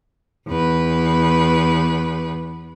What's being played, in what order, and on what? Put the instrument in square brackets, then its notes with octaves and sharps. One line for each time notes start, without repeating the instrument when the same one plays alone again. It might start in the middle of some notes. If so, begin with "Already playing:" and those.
[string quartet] E2 B4